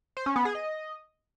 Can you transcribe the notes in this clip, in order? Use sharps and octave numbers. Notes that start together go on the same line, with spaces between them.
C5
C#4
B3
G#4
D#5